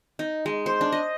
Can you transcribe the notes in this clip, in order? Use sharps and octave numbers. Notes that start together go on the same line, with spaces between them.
D#4
G#3
C5
D4
D#5